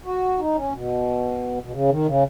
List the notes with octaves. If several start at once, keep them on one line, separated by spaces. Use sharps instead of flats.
F#4
D#4
C#4
B2
B2
C#3
D#3
C#3